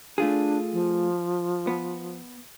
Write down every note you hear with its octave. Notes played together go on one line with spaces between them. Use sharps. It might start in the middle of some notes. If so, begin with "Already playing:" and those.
A3 D4 F4 G#4
F3
B3